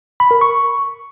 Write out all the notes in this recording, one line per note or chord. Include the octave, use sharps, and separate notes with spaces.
B5
A#4
C#6